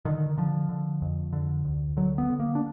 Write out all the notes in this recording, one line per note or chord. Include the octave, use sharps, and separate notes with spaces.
D3 D#3
D3 F3
D3
F2
D3
D2
D3 F#3
B3
D3
A#3
D4